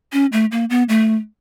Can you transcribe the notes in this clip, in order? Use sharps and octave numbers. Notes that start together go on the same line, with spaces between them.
C#4
A3
A#3
B3
A3